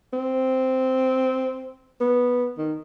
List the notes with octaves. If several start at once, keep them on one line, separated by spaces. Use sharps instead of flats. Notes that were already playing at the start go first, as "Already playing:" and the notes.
C4
B3
D#3